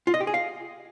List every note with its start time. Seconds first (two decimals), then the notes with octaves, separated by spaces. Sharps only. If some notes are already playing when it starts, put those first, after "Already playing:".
0.07 F4
0.14 D#5
0.20 G4
0.27 G#4
0.34 F5